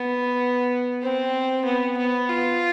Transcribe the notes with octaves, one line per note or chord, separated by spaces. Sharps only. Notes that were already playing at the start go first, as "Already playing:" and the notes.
Already playing: B3
C4
B3
B3
F4